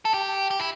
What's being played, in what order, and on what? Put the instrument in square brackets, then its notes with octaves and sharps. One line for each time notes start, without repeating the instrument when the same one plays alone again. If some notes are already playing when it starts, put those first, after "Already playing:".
[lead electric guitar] A4
G4
G4
E4